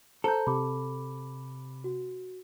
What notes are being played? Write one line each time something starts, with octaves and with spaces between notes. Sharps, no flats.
A4 C5 A#5 G6
C3 B5 D6
F#4